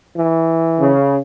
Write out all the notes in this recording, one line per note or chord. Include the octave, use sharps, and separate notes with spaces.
E3
C#3